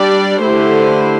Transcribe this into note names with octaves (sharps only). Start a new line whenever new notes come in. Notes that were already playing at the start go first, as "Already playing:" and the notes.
Already playing: G3 D4 G4 D5
D3 A3 E4 G4 C5